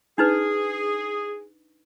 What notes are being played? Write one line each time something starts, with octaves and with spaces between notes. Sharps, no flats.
D4 D#4 G#4 B4